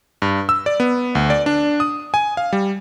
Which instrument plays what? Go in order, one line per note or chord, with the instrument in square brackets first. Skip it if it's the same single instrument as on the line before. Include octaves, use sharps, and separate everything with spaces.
[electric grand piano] G2
E6
D5
B3
D2
D5
D4
D#6
G#5
F5
G3